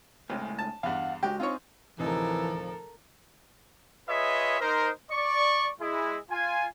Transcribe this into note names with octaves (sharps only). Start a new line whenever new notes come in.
C2 A2 C#3 G#3
A5
E2 G2 F5 F#5
C#3 G#3 F#4 G4
C4 D#4 F4 C5 C#5
D1 C3 E3 F3 D#4 A4 A#4
F4 G#4 B4 C#5 D#5 E5
D#4 A#4 C5
D5 C#6
G#3 E4 G#4
F4 G#5